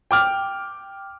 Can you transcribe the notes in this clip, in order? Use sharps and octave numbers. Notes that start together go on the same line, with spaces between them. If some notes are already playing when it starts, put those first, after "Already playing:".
G5 D6 F6